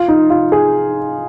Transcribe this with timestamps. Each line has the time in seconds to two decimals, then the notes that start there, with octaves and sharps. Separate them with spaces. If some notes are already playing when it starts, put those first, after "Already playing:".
Already playing: F4
0.08 D#4
0.30 F4
0.52 G#4